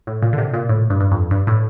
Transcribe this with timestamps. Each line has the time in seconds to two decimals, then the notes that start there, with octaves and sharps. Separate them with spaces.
0.07 A2
0.22 A#2
0.33 D3
0.38 C3
0.53 A#2
0.69 A2
0.90 G2
1.01 G2
1.11 F2
1.31 G2
1.47 A2